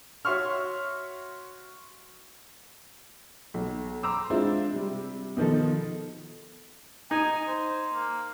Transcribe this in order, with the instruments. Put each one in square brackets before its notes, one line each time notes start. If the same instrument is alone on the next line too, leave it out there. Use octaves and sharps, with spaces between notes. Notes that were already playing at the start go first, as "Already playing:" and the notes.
[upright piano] F#4 C#5 E5 C6 C#6 F6
B1
A#5 C6 D6 E6
G#3 C4 D4 E4 F4
C3 G3
B2 D#3 F3 D#4 A4
[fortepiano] D#4 [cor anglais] G#5
[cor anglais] C5
A#3